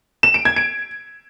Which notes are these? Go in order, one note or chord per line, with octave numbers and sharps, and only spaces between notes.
E7
D7
G#6
D7